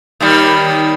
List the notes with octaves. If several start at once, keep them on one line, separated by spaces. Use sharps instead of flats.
D#2 D#3 G3